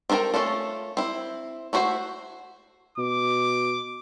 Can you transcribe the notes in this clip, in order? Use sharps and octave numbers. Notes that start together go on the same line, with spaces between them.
C4 A4 A#4 C#5 G5
A3 C#4 F4 A4
C4 E4
A3 E4 F#4 C5
B2 D6